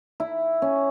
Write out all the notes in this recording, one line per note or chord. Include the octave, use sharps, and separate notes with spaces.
E4
C#4